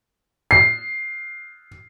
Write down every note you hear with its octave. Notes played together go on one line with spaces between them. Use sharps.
C7